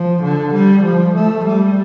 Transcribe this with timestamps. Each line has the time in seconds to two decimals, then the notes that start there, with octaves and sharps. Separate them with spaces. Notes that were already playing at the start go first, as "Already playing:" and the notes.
Already playing: F3
0.22 D3
0.54 G3
0.84 F3
1.15 A3
1.45 G3